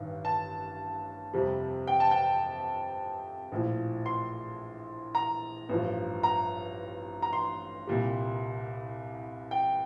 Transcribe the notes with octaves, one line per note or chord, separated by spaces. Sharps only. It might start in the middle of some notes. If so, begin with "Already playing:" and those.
Already playing: A1 G2 D#3
A5
F2 C3 G3
G5
A5
G5
A#1 A2 F3
C6
A#5
A1 G2 F3
A#5
A#5
C6
C2 A#2 G3
G5